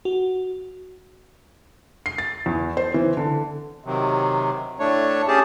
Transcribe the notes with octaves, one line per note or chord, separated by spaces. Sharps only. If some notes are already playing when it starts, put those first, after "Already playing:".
F#4
C7
A6
E2
C5
E3
D3
C3 D#3 F#3
A2 A3 D4 C#5
C#4 G4 G#4 A5